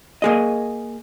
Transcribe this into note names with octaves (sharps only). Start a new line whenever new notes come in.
A#3 G#4 D#5